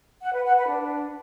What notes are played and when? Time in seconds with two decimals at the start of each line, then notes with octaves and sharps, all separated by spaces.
0.22 F#5
0.34 B4
0.45 F#5
0.56 B4
0.68 D4